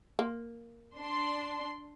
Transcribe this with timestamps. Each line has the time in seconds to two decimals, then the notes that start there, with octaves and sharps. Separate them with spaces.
0.19 A#3
0.97 D4 C6